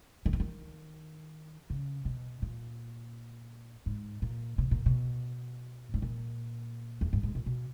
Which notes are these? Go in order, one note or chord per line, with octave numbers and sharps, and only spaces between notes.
D#3
E3
D#3
C#3
B2
A#2
G#2
A#2
B2
A#2
B2
G#2
A#2
E2
G2
G#2
A#2
B2